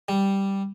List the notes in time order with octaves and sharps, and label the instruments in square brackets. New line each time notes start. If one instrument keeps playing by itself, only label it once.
[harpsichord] G3